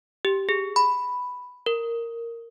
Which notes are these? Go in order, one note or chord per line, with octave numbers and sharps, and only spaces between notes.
G4
G#4
B5
A#4